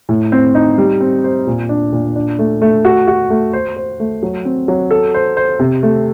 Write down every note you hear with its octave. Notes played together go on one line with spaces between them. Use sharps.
A2
C4
D#4
G3
C4
C5
A#2
D4
A#2
D4
A3
A3
F#4
F#4
A3
C5
C5
A3
F#3
C4
F#3
A4
C5
C5
C3
A3